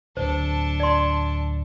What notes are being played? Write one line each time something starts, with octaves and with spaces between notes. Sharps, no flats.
D1 D4 A4 C5
D5 C6